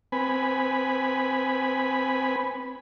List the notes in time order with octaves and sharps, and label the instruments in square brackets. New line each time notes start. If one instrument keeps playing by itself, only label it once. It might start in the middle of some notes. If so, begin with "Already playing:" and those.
[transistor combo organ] C4 B4 G#5 B5